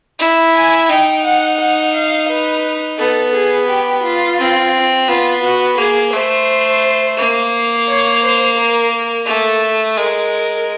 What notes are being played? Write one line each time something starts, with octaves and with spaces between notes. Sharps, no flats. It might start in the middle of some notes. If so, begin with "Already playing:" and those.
E4
G#5
D#4 G5
F#5
F#5
F5
B4
B3 A4
G#4
G4
F4
C4
B3 F4
F#4
A#3 G#4
A3 C5
A#3
C#5
C5
A#4
A3 A4
G#3 A#4